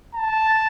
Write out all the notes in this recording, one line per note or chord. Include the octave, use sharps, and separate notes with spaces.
A5